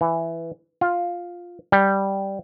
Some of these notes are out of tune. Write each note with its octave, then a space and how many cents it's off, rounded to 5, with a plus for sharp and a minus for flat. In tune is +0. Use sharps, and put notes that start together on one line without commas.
E3 +5
F4 +5
G3 -5